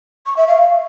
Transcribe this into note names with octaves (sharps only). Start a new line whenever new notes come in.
C#6
E5
F5